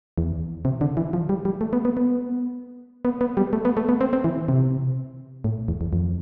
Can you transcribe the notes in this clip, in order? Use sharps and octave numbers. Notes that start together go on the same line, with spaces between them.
E2
C3
D3
E3
F3
G3
G3
A3
B3
B3
B3
B3
B3
G3
A3
B3
A3
B3
C4
C4
E3
C3
A2
E2
E2
F2